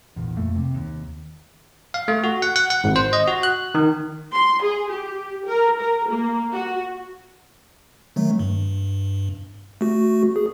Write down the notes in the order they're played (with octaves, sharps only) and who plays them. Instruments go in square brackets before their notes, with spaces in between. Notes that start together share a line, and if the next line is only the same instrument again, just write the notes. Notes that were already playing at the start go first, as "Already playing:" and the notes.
[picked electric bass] A#1 E2
A#1 F2 A3 A#3
C3
D#2
[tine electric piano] F5
A3
F#4
F#5
F#5
F#5
G#1
C5
D#5
F#4
F#6
D#3
[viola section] C6
G#4
G4
A#4
A#4
A#3
F#4
[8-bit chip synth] D#3 F#3 A3
G2
A3 F#4
G#4